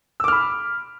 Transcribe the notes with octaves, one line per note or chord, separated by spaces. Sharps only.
B5 D6 E6 F6